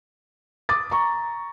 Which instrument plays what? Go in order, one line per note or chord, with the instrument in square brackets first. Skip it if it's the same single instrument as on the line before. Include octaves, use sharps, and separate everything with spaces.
[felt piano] D6 D#6 A6
A#5 C#6